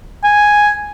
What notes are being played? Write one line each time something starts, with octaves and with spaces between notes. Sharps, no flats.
G#5